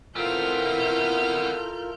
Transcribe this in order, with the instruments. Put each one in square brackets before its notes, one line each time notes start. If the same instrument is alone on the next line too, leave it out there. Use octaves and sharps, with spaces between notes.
[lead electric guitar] B3 C4 [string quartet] E4 F6 G6 [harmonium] F4 A4 A#4